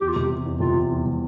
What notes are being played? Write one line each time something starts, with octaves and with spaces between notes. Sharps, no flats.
E2 G4
F4
C3 G4
E2
E2
C3 F4
E2
E2
C3